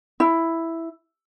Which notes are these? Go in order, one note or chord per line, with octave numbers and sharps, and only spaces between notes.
E4